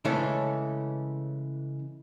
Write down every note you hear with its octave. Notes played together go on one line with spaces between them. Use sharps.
C#3 E3 G#3 A3 C#4 A4